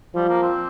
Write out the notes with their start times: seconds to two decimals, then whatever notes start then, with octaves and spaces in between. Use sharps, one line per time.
0.15 F3 G3
0.29 A#3
0.43 C4